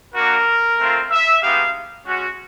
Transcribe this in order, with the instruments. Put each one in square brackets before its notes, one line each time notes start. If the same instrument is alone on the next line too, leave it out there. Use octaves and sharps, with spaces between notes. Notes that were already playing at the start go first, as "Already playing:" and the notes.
[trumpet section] A#3 D4 F#4 A#4
A3 C4 F4
E5
G#3 B3 D#4 G4 F5
G#3 C#4 F#4